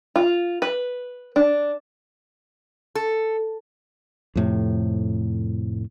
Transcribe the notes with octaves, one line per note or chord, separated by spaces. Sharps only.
F4
B4
D4
A4
F2 A2 C3